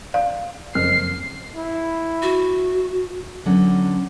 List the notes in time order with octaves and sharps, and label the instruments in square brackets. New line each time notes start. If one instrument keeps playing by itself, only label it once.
[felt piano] D5 [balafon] F5
[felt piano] F#1 F2 F6 [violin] C7
[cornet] E4
[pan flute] F#4
[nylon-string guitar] D3 F#3 B3 C#4 F#5